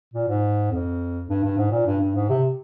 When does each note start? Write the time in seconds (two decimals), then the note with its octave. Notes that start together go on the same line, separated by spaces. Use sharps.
0.13 A#2
0.28 G#2
0.71 F2
1.29 G2
1.43 G2
1.57 G#2
1.71 A#2
1.86 G2
2.00 G2
2.15 G#2
2.29 C3